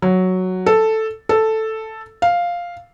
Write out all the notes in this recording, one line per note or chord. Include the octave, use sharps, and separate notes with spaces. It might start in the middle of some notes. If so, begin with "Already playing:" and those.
F#3
A4
A4
F5